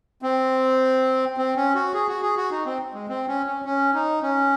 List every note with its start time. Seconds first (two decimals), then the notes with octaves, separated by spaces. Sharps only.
0.22 C4
1.37 C4
1.56 C#4
1.75 F#4
1.94 G#4
2.08 F#4
2.22 G#4
2.37 F#4
2.51 D#4
2.65 C4
2.94 G#3
3.09 C4
3.28 C#4
3.46 C#4
3.65 C#4
3.94 D#4
4.22 C#4